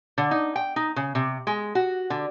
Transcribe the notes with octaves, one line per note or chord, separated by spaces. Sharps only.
D3
D#4
G5
D#4
C#3
C3
G#3
F#4
D3